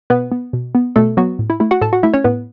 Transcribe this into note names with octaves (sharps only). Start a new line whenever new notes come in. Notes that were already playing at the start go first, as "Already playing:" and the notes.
B2 B3 B4
B3
B2
B3
B2 A3 A4
F#3 B3 F#4
A2
E4
A3 E4
F#4 F#5
A2 A4 A5
F#4 F#5
A3 E4 E5
C#4 C#5
A2 B3 B4